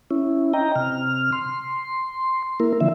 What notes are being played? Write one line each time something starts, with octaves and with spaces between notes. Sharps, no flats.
C#4 E4
D#5 G5 A#5
C3 F6
C6
A#3 E4 A#4
D3 F3 E5